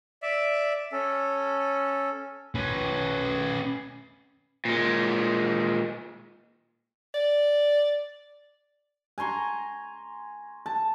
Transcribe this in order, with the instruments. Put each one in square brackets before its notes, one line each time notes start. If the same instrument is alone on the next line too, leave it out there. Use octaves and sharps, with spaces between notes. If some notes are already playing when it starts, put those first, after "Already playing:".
[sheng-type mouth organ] D5 E5
C#4 A4
[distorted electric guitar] C#4 B4
[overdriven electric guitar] A#2 G#3
[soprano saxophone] D5
[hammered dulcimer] G#5 A#5 C6 C#6
A5